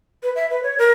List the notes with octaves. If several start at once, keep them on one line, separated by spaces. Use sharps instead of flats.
B4
E5
B4
C#5
A#4